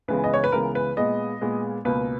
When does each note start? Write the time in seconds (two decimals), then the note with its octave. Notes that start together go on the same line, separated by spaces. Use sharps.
0.08 C#2 C#3 E3 G#3 B3 B4
0.24 D#5
0.34 C#5
0.44 B4
0.52 C#2 C#3 E3 G#3 B3 A#4
0.75 B4
0.97 A#2 G#3 B3 D#5
1.41 A#2 G#3 B3
1.85 C#2 B2 A#3 B4